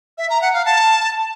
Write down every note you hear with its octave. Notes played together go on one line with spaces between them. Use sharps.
E5
A#5
F#5
F5
A5